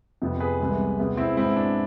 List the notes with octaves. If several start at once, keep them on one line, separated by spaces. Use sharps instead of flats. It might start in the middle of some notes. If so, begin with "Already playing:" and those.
F2 C3 F3 B3
G#4 B4
C2 C3 E3 G#3 B3
E2 C3 G#3 B3
C4 E4
G#2 G#3 B3 C4 E4
D4